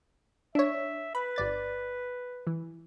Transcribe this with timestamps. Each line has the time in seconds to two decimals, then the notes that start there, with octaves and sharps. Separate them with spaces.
0.55 D4 C#5 E5
1.15 B4 B5
1.36 G1 D5 A6
2.47 E3